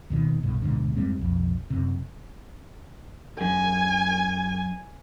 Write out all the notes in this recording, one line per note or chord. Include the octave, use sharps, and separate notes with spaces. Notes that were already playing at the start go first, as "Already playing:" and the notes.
D#2 B2 D#3
B1 G2 B2
D1 G#2 B2 D3
F1 G#2 G3 C4
B1 F2
F#2 C3
F#2 G#5